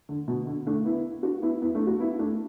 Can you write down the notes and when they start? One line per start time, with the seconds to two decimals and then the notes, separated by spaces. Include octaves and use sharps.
0.09 D3
0.28 B2
0.47 D3
0.67 A3 D4
0.85 B3 E4
1.23 D4 F#4
1.42 B3 E4
1.62 B3 E4
1.75 A3 D4
1.87 D4 F#4
1.99 B3 E4
2.19 A3 D4